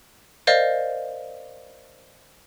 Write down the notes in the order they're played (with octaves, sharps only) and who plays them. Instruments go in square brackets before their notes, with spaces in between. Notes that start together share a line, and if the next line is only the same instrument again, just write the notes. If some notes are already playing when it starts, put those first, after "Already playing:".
[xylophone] A#4 C5 D5 D#5 F5